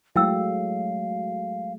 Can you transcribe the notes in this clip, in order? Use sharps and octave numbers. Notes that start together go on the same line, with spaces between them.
F#3 G#3 A3 E4 F5 G5 E6